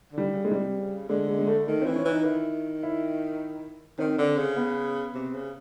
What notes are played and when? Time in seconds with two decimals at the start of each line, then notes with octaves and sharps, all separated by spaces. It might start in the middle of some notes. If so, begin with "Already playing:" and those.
0.12 D3
0.18 G3
0.32 C#3
0.44 G#3
0.51 C3 G3
0.79 C#3
1.09 D3 G#3
1.28 G#3
1.39 G#3
1.47 A3
1.67 D#3 A3
1.82 E3 C4
1.95 C#4
2.05 E3 D#4
2.25 D#3 E4
2.83 E4
3.99 D#3 C4
4.18 D3
4.38 C#3
4.56 B3
5.15 C3
5.34 C#3